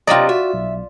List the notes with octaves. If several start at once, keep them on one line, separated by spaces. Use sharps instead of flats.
C3 F#3 F4 D5 D#5 A#5
F#4 E5
B1